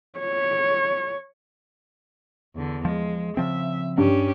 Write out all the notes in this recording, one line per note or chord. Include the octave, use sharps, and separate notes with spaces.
C#5
E2 D3
F3 G#3
C#3 F3 C4 E5
G2 C#4 G4